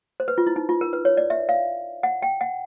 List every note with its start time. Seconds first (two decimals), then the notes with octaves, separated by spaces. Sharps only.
0.20 C5
0.28 B4
0.38 F4
0.47 E4
0.56 D#4
0.69 F4
0.81 A#4
0.93 B4
1.05 C#5
1.17 D5
1.30 E5
1.49 F5
2.03 F#5
2.22 G5
2.41 F#5